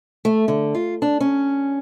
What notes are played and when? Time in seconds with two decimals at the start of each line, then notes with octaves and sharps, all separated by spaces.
0.25 A3
0.48 D3
0.75 F4
1.02 D4
1.20 C#4